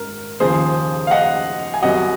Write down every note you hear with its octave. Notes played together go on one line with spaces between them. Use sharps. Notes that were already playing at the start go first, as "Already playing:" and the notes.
Already playing: G#2 A#4
D#2 C#3 F3 G#4 C5
F5
D#5 F#5
G#5
C2 C3 F#3 D#5 F#5